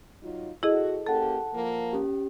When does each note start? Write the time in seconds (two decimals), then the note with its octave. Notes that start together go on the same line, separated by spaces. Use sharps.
0.23 F#3 D#4 F4
0.63 E4 F#4 G#4 A4 D#5
1.07 A#3 C#4 G4 A4 F#5 A5
1.54 F3 A#3
1.93 C#4 G4